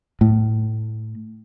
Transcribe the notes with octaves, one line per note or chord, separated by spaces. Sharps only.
A2